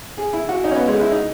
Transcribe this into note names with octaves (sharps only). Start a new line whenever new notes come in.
G#4
E4
F#4
D#4
C#4
B3
G#3
E4
D#4